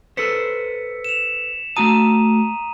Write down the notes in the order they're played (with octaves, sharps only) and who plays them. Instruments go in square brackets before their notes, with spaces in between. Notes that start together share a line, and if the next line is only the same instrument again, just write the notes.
[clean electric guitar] A4 B4 C5 [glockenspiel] B6 C#7
[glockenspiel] E7 F7
[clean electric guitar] A3 F#4 A5 [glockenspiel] A#5 D#6 D#7